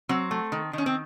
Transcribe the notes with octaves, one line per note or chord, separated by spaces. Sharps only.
F#3 C4
A3
D#3
D#3 C#4
C4